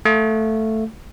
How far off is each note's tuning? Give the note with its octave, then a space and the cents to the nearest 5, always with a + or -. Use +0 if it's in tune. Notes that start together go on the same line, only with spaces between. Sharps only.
A3 +0 F5 +10